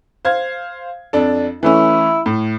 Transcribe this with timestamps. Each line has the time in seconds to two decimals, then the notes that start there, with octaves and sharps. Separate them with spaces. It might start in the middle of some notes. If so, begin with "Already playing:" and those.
0.25 C5 F5 G#6
1.13 F2 D4 A4
1.63 E3 A3 C#4 E4
2.26 A2